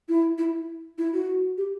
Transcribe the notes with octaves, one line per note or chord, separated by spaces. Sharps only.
E4
E4
E4
F#4
G4